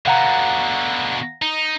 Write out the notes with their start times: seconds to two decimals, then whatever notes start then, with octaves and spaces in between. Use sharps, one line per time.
0.06 B2 D3 F5 F#5 A#5
1.42 D#4